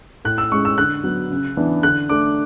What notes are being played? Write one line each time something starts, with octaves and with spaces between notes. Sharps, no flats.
A2 F#6
E6
G#3 C#4 C#6
E6
D3 F#6
F#3 B3
C#3
E3 B3 D4
D3 F#6
A3 D4 D6